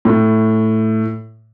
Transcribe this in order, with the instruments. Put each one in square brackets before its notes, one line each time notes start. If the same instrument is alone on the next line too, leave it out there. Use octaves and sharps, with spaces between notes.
[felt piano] A2